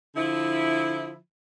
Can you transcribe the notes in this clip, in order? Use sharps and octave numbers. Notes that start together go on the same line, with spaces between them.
D3 F3 E4